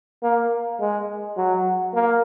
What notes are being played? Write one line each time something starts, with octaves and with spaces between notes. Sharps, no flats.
A#3
G#3
F#3
A#3